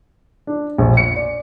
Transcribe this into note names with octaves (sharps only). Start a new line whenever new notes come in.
D4
A#1
C#7
D5